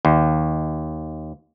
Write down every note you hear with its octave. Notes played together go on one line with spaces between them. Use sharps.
D#2